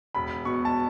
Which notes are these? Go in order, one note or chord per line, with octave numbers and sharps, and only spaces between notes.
E1 B5
B2 C#6
A5